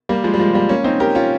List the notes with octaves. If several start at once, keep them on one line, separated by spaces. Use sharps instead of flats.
G3 A#3
F3 G#3
G3
F3 G#3
G3 A#3
A#3 C#4
C4 D#4
G4 A#4
C#4 F4